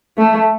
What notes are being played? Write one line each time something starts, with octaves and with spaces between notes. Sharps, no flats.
A3